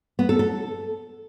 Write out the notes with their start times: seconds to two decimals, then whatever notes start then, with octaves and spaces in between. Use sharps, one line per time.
0.19 B3
0.29 A4
0.39 A4